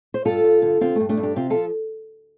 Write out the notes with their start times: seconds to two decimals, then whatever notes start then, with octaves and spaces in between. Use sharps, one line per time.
0.14 C5
0.25 G2 F4 A4
0.44 G2
0.62 D3
0.81 D3 C4 F4
0.95 G2 A3
1.09 A3 D4
1.17 G2
1.23 D4 G4
1.36 C3 C4 F4
1.50 F3 F4 A4